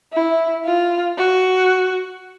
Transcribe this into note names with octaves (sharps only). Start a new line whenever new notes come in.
E4
F4
F#4